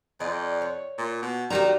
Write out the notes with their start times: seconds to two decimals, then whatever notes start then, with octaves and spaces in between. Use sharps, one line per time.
0.20 F2 D5 D#5
0.62 C#5
0.98 A#2
1.22 B2
1.50 D#3 F#4 G4 D5 A#5